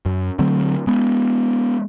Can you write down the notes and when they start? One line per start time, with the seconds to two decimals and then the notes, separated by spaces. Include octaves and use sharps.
0.06 F#2
0.39 D3 F#3 A3 C4
0.87 G#3 B3